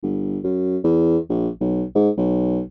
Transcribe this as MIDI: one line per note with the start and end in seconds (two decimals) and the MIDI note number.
0.03 0.39 31
0.44 0.78 42
0.84 1.18 40
1.30 1.49 34
1.61 1.85 35
1.95 2.10 44
2.17 2.61 35